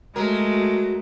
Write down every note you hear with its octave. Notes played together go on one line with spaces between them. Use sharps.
F#3 G#3 A3 A#4